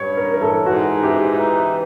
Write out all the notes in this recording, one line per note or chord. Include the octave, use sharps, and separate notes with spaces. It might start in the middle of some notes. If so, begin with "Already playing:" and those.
Already playing: G2 C#5
A#4
E3 A#4
A4
G#2 F#4
E3 G4
D#4